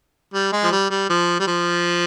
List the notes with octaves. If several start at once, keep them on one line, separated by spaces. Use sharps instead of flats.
G3
G#3
F3
G3
G3
F3
G3
F3